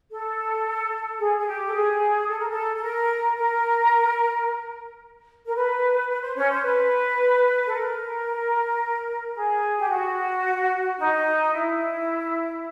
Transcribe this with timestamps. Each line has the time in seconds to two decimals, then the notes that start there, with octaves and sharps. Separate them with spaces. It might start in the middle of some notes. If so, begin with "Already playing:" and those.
0.11 A4
1.19 G#4
1.39 G#4
1.47 G4
1.67 A4
1.74 G#4
2.28 A4
2.39 A#4
2.50 A4
2.75 A4
2.82 A#4
3.37 A#4
5.46 A#4
5.55 B4
6.09 B4
6.22 C5
6.36 C#4 C#5
6.50 C5
6.63 B4
7.67 A4
7.72 A#4
9.35 G#4
9.78 G4
9.90 F#4
10.99 D#4
11.53 E4